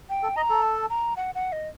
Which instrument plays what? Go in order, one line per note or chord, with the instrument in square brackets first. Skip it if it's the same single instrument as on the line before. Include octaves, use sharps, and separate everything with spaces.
[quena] G5
[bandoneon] A4
[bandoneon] D#5 [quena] A#5
[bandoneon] A4
[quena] A5
A#5
F#5
F#5
D#5